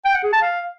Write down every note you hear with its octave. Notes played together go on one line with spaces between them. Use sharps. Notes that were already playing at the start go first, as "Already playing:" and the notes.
G5
F#5
G#4
A5
F5